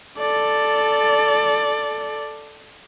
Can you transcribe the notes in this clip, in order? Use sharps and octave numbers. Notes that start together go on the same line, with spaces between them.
A4 D5